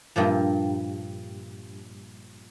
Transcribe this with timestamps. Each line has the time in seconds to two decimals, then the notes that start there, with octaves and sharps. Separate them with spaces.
0.16 G2 A#2 F3